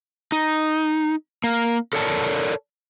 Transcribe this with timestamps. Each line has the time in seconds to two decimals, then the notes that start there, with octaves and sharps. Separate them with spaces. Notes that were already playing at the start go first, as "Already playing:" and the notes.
0.32 D#4
1.44 A#3
1.93 A4 A#4 C#5 D5 A5